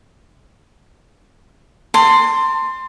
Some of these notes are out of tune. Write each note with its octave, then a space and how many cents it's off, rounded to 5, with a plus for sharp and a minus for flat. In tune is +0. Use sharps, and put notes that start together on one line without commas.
A5 +35 C6 +0